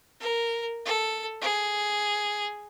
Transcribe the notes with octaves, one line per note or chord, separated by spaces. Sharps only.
A#4
A4
G#4